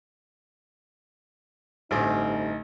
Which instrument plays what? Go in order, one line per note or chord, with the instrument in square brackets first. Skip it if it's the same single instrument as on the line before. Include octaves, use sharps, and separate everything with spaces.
[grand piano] A1 [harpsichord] D2 G2 C4 [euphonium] D#4